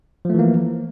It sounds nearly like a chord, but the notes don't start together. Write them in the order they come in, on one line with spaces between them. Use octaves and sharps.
F3 A3 E3 A#3